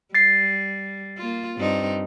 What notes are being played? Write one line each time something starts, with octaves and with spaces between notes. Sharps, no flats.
G3 A6 C7
A#3 F4
G2 C4 D#4